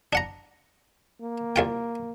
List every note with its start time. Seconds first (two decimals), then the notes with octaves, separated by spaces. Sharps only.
0.13 D4 F#5 A#5
1.21 A#3
1.56 C2 F4 G5